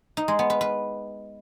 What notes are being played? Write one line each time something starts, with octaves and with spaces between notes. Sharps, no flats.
D#4
G#3
B3
B4
B4